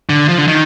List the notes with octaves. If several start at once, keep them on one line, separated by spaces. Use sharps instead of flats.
D3
F3
D3
D#3